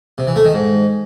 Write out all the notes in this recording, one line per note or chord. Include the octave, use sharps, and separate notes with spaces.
C3
E3
A3
D#3
G#2